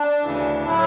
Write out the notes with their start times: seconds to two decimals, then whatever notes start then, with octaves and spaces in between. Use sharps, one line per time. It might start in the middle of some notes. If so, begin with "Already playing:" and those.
Already playing: D4
0.22 D2 C#3 E3
0.65 A2 F#3 E4